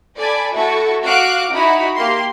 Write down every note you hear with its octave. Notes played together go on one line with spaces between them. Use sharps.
A4 D5 G#5 B5
A3 E4 F#4 A4 C#6
F#4 F5 D6 F#6 D7
D#4 E4 F#4 B5
A#3 G4 C6